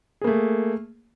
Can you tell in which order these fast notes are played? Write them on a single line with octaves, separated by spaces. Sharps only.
G#4 A#3 A3